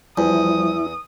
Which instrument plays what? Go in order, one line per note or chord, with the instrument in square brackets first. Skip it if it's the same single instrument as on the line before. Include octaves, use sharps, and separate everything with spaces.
[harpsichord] E2 [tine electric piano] F3 G3 [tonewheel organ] E4 [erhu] D#6